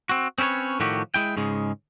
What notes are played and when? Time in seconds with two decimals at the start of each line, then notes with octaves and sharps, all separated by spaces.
0.09 C4 F#4
0.38 C4 C#4 E4 B4 C#5
0.80 A2 D#3 F3 A3 F#4 G4
1.14 G#3 E4 G5
1.37 G#2 C#3 G#3